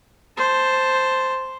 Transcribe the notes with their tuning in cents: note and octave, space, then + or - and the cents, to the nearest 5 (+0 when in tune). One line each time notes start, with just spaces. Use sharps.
C5 +0 A5 +0